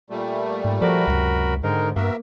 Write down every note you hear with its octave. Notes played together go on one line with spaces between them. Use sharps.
A#2 G3 A3
G#2
F3 F#4 A4 A#4 C5 D5 B5
C#2 F#2 A2 C3
G#2 D3 D#3 G#3 D#4 A#4
G2 A#3 B3 F#4 A#4 E5